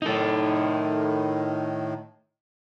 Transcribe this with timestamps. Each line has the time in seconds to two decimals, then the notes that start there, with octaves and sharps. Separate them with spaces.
0.02 A2 D#3 D#4 A4